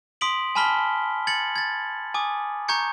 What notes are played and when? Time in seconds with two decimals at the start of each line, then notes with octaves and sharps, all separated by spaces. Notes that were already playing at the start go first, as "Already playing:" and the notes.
0.21 C6 D#6 B6 D7 F#7
0.55 G#5 A5 B5 F6 B6 G7
1.27 G#6 A6 C#7 F#7
1.56 G#6 A6
2.14 G#5 D6 D#6
2.68 A#5 C#6 G6 G#6 C#7